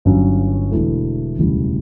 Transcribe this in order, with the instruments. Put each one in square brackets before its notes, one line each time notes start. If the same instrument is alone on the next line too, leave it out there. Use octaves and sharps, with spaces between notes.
[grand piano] G1 G2 F#3 C#4
E1 E2 D3 A3 E4
E1 D2 C#3 E3 G3